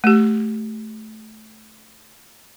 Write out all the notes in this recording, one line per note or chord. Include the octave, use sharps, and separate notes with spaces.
A3 G4